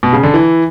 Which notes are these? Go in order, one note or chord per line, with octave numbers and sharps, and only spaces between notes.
B2
C#3
D3
E3